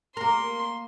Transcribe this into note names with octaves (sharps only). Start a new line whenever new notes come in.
A#3 A#4 C6